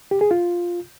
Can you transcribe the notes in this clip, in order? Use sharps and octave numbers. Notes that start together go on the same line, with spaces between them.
G4
G#4
F4